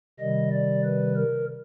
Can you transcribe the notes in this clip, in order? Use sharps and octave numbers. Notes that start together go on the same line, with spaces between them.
C3 D#3 G3 D#5
D5
B4
A#4